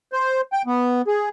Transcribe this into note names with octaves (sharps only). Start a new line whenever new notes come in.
C5
G5
B3
G#4